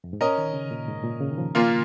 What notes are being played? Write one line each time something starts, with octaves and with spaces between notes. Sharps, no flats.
F2
G#2
A#2 C#4 A#4 D#5
D#3
C#3
A#2
G#2
A#2
C#3
D#3
F3
A#2 A#3 F4